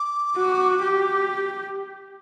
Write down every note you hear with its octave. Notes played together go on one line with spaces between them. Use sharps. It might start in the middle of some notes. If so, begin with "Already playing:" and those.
Already playing: D6
F#4
G4